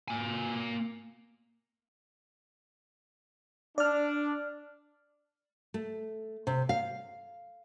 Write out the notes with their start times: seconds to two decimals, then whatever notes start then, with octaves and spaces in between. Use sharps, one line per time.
0.08 A#3 G#5
3.78 D4 D5 F6
5.74 A3
6.47 C3
6.69 F5